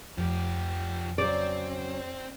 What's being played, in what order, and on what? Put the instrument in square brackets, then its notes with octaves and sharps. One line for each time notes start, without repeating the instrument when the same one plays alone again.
[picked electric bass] F2 [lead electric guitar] F3 G4
[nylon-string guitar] C#3 F#3 [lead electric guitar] C4 [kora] D5